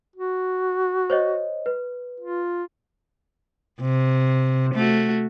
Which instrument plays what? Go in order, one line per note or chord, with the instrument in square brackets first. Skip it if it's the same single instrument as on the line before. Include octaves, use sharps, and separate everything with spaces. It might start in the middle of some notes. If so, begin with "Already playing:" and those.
[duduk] F#4
[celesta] C5 C#5 D#5
B4
[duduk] F4
[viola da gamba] C3
A3 F#4